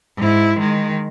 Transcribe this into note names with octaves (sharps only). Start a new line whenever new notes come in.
G#2 E4
D#3 G#3